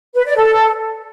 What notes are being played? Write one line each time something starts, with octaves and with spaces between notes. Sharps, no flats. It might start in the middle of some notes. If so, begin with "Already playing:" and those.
B4
D5
A4